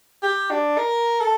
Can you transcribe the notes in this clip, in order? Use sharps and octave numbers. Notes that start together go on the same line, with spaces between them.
G4
D4
A#4
A4